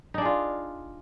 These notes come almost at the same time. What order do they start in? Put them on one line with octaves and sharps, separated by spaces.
D#4 D4 G#4 F4